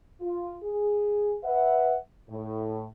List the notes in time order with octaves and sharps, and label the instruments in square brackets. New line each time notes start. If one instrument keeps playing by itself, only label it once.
[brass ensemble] F4
G#4
B4 E5 F#5
A2